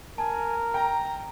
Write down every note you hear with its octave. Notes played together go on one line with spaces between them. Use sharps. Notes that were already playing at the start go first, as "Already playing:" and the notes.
A#4 G#5 A5
G5 A#5